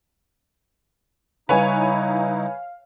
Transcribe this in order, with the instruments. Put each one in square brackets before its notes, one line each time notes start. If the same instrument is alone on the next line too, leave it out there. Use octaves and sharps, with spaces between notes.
[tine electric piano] C#3 G3 [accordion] D#4 E4 [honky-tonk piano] B4 C#5 G#5 [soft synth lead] F5